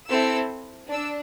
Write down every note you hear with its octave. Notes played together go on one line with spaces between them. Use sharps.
C4 E4 A4 E6
D4 E6